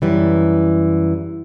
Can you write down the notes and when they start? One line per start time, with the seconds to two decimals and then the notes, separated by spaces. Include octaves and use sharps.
0.02 F#2 E3 G3